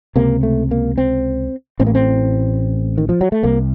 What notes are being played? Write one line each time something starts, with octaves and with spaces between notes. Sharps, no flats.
C#2 C3 A#3
A3
A#3
C4
A1 A2 C4
A#3
C4
D#3
F3
F#3
A3
C2 C3 A#3